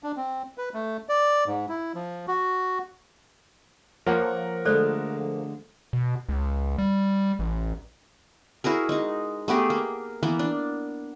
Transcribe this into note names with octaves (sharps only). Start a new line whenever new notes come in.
D4
C4
B4
A3
D5
G#2
E4
F3
F#4
F3 A#3 A#4 C#5 F#5
D3 G#3 A3 A4 C5 D5
B2
C#2
G3
A1
E4 F#4 G#4 A#4
G#3 D#4
A3 B3 G4 G#4
A#3
E3 A#3 B3
D4